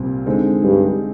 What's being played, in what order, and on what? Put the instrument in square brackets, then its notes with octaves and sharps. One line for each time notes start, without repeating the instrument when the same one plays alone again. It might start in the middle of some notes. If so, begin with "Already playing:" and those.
Already playing: [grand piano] C2 A#2 G3 C4
D3 G#3 C4 D#4
[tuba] G2